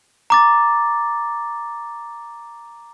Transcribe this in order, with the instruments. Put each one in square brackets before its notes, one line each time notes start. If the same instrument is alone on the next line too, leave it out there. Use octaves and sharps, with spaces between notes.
[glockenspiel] A#5 D6 A6